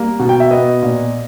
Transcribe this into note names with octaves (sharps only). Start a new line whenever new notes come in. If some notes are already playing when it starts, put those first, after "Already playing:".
Already playing: G3 A#3
B2
G5
E5
B3 D#5
A#2